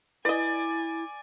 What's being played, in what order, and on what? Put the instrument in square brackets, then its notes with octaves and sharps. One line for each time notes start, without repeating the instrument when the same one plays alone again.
[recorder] E4 [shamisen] B4 D#5 [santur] D5 [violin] G#5